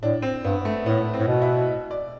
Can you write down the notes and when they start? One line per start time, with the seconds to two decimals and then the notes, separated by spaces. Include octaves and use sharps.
0.02 A2 D4
0.22 C4
0.44 G2 B3
0.65 A3
0.86 A2 B3
1.14 C4
1.19 A2
1.27 B2
1.42 E4
1.91 D5